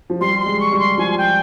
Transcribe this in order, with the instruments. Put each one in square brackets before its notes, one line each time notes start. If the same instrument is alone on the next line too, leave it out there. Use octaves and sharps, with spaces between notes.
[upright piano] F3
[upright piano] G3 [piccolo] C6
[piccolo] C6
[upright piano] G#3
[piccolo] C#6
[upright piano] G3
[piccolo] C6
[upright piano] F3 [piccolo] G#5
[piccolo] G5